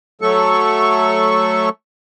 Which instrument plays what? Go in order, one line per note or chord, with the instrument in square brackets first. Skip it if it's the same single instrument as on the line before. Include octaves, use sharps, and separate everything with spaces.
[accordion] F#3 A3 A4 C#6